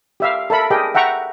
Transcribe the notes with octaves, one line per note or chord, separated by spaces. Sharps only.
G4 E5 F5
A4 A#4 E5 B5
G4 G#4 A#4 D#5 G5
E5 F#5 G5 A#5 C#6